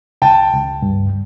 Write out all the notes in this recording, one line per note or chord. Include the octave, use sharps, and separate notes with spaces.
C#2 G5 A5
C#2
G2